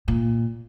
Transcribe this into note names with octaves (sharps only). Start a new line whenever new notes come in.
A#2